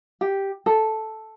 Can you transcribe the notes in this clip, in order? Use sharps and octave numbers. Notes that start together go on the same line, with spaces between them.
G4
A4